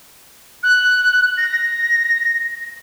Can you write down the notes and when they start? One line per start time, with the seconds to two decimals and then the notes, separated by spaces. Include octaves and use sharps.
0.63 F#6
1.37 A#6